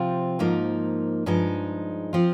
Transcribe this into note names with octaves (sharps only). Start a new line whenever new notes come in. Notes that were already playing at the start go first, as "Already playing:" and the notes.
Already playing: C3 F3 C4 F4
G#2 F3 A#3 D#4
G2 F3 G#3 D#4
F3 C4 F4